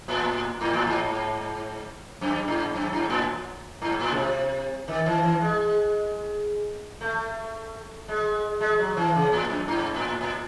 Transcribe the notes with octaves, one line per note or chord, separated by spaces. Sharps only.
A2
G#2
A2
G#2
F#2
G#2
F#2
G#2
A2
G#2
A2
C#3
C3
D#3
E3
E3
G#3
A3
G#3
G#3
F#3
E3
C#3
A2
F#2
G#2
A2
A2